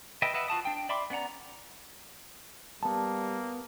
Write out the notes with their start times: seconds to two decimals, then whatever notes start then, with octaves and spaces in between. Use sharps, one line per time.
0.22 B4 D#5 E5 G5
0.34 B4 D#5 E5 F#5
0.48 F4 F#4 A5 D#6
0.65 D4 G5
0.89 D5 E5 B5 C6 D6
1.10 B3 C#4 D5 F#5 A#5
2.83 G3 A#3 B3 A5